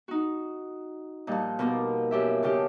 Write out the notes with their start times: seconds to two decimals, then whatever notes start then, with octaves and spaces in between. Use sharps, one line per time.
0.08 D#4 F#4
1.27 A#2 F3 G3 D#4
1.59 B2 A#3 F4 A#4
2.11 F#2 G4 E5
2.43 C#3 F4 G4 G5 A5 D6